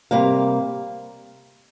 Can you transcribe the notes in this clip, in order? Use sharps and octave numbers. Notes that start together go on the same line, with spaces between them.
C3 G3 A#3 F5